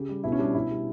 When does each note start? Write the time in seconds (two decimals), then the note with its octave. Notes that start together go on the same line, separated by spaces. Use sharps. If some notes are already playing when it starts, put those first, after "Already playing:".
Already playing: C#3 G4
0.09 G3
0.24 B2 E4
0.32 C#4
0.39 G3 D4
0.54 B2 E4
0.71 G3